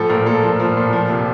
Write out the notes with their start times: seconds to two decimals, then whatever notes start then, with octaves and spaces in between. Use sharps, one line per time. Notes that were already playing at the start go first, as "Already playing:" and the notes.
Already playing: A2 F3 A4
0.10 A#2 A#4
0.26 A#2 A4
0.43 F3
0.60 F3
0.77 A#2
0.93 F3
1.10 C3